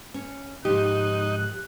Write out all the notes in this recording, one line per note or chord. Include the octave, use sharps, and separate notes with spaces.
C#4
G#2 F3 D#4 G4 C5 F#6